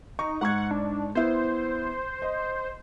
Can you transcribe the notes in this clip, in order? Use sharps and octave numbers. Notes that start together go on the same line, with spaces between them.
D#4 C#6
G#2 F#5 C#6 G#6
D4
B3 E4 C5
D#5